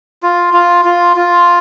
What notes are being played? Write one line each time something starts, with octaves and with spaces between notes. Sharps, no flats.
F4
F4
F4
F4